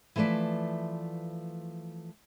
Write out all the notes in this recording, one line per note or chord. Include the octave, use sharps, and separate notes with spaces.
E3 F3 A3 B4 D5